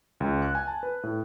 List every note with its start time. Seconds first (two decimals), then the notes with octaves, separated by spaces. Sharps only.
0.20 C#2
0.42 F#6
0.55 G#5
0.68 A5
0.83 B4
1.03 A2